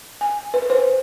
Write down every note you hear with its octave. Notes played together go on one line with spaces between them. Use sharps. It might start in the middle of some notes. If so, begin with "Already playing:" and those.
G#5
B4
C5